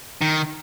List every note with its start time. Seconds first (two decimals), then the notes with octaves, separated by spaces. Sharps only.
0.21 D#3